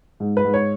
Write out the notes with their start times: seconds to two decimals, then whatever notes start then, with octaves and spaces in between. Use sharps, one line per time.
0.20 G#2
0.37 B4
0.45 G#2
0.54 C#5